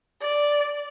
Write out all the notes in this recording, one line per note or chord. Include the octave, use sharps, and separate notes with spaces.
D5